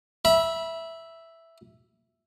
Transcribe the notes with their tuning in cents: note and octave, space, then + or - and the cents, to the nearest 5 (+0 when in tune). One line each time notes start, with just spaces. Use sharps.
E5 +0 B5 -25